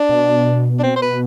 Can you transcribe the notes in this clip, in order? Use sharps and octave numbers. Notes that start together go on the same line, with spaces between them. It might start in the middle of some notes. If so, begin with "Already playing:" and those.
Already playing: D4
B2
D4
C4
C5
B4